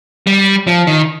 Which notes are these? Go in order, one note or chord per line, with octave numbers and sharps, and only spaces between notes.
G3
F3
D#3